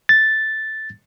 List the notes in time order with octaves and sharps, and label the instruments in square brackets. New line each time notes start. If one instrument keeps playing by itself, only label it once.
[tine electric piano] A6